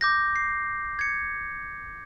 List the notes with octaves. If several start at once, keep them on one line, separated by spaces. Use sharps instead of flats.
D6 G6 A#6
C7
G#6 C#7